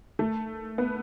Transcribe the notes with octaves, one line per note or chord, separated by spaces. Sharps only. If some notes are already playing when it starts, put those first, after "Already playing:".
A3
B3